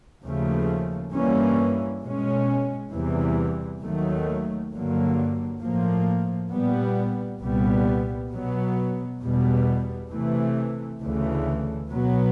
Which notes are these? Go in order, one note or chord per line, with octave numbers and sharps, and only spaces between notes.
D#2 C#3 F3 A3
G2 E3 G3 A#3 C#4
B2 G#3 C#4
E2 C3 E3 G3
D#2 D#3 F#3 A3
G2 D3 F#3 A#3
A2 F3 A#3
A#2 G3 B3
C2 A#2 G3 B3
B2 F#3 B3
E2 B2 G3 B3
C3 E3 A3
D2 C#3 E3 A3
B2 F#3 B3